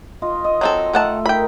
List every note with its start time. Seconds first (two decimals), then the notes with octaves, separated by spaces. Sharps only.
0.22 F4 D#5
0.44 D#5
0.61 F#3 C4 A4
0.93 D#3 A3 F#5 A5
1.26 D#4 A#4 G5 B5